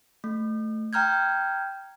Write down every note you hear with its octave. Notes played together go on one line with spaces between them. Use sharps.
A3
G5 A#5 F6 G6 G#6